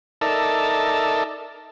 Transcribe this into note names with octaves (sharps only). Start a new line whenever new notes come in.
D#4 A4 A#4 D5 E5 A5